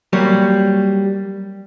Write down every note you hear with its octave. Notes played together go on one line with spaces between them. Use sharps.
F#3 G3 A#3 C#5